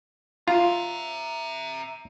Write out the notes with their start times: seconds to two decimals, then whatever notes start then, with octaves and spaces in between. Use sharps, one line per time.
0.48 F4 E5 A#5